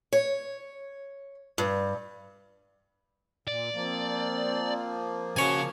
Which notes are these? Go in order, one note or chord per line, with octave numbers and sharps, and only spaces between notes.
C#5
G2
A#2 D5
F3 A#3 C4
C#3 F#4 C#5 G#5